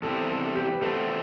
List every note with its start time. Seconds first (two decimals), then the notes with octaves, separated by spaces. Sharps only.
0.02 E2 C3 G3 C4 E4 A4
0.29 A4
0.55 G4
0.73 B4
0.82 E2 B2 A3 C4 A4